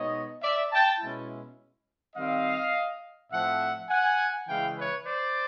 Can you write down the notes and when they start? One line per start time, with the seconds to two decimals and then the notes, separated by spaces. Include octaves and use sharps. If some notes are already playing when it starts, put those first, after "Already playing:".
Already playing: B2 G#3 B3 D#4 C#5 D#5
0.43 D5 E5
0.72 G5 A5
1.00 B2 G#3 C#4 E4
2.16 D#3 G3 C4 D#5 F5
3.32 A2 F3 A3 C4 E5 F#5
3.89 F#5 G#5
4.48 C#3 E3 G#3 C#4 E4 F5 G5
4.77 B4 C#5
5.05 C5 D5